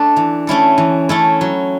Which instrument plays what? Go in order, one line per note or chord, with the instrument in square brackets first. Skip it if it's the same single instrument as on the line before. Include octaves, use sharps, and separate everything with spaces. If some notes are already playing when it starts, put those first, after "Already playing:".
Already playing: [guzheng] A3 D4 A4
E3
A3 C#4 E4 A4
E3
A3 C#4 E4 A4
F#3